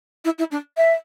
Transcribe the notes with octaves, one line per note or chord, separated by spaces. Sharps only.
E4
E4
D4
E5